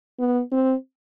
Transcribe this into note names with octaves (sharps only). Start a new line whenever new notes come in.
B3
C4